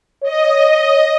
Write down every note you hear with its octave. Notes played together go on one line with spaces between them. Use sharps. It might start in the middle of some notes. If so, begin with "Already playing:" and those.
C#5 D#5